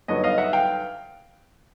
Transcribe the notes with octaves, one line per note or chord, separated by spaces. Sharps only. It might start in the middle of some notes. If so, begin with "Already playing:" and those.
G2 D3 F#3 B3 D#4 C#5 D#5
D#5 F5
E5 F#5
F5 G5